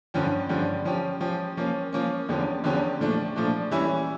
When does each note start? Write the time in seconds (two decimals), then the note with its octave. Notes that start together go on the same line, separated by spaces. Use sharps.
0.14 G2 D3 F3 C#4 G4
0.49 G2 D3 F3 C#4 G4
0.85 F3 C#4 G4
1.20 F3 C#4 G4
1.57 F3 A#3 C#4
1.93 F3 A#3 C#4
2.29 E2 D3 F3 C#4 G4
2.64 E2 D3 F3 C#4 G4
3.00 A#2 F3 A3 D4
3.36 A#2 F3 A3 D4
3.71 E3 G3 C#4 E4